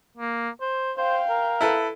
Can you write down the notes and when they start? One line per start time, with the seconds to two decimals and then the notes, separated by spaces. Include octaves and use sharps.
0.17 A#3
0.61 C5
0.97 C5 F5 G5
1.29 A#4
1.61 E4 A4 B4